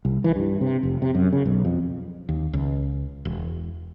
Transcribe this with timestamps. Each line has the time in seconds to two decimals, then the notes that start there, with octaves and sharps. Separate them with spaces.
0.05 C2
0.24 E3
0.36 G2
0.61 C3
0.83 F1
1.02 C3
1.15 F#2
1.33 C#3
1.46 B1
1.65 F2
2.29 D#2
2.53 C#2
3.25 E1